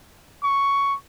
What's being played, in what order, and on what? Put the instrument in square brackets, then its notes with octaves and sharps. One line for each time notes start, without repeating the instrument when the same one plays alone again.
[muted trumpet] C#6